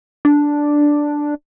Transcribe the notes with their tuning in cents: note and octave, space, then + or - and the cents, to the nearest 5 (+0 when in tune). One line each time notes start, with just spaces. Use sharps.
D4 +0